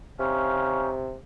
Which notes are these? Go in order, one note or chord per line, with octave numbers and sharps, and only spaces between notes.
C3 C#4 D#4 F5